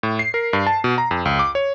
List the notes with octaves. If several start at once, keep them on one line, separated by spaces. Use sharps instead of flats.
A2
C7
A#4
G2
A5
B2
A#5
F2
C#2
D6
C#5